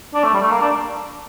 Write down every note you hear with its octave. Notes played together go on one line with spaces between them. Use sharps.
D4
A3
G3
A3
A#3
D4